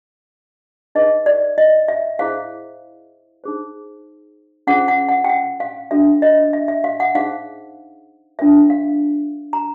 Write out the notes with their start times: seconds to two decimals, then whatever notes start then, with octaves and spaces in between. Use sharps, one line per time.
0.95 D#4 G#4 B4 D#5
1.26 D5
1.58 D#5
1.88 E5
2.19 E4 G#4 C5 F5
3.44 D#4 G#4 C5
4.67 C#4 F4 G#4 C5 F#5
4.88 F#5
5.09 F#5
5.24 G5
5.29 F#5
5.60 F5
5.91 D4 F#4 A4 E5
6.22 D#5
6.53 E5
6.68 E5
6.84 F5
7.00 F#5
7.15 D#4 G#4 C5 F5
8.39 D4 F4 A#4 C#5 E5
8.70 F5
9.53 A#5